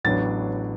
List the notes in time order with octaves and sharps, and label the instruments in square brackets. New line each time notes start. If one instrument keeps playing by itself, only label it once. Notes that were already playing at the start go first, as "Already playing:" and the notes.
[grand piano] A1 A2 F#3 B3 D4 A6